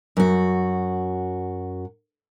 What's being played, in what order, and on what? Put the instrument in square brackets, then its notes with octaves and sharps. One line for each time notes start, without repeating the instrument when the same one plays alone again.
[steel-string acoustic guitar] F#2 F#4